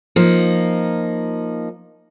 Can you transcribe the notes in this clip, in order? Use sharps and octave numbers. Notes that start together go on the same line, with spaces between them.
F3 A#3 D#4